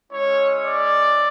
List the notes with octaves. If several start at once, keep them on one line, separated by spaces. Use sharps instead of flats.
G#3 C#4 E4 C#5
D5